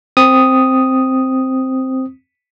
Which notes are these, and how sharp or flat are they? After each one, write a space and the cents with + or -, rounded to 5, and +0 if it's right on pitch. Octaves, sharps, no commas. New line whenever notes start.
C4 +0 D#6 +0